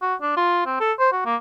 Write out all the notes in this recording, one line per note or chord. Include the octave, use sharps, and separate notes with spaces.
F#4
D4
F4
C4
A4
C5
F#4
A#3